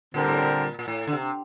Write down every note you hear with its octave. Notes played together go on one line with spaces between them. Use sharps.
A#2 D3 G3 C4 G4 A#4
A2
A#2
A#2
A2
D3
C3